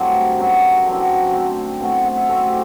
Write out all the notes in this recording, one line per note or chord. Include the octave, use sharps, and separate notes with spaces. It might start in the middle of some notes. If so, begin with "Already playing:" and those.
Already playing: G2 F#3 A3 C4 C5 D5
F#2 F#3 B3
D3 F#3 C4 D5
D3 A3 C4
B2 A3 C4 F#5
F#5
E5
B2 A3 C4 A4
G4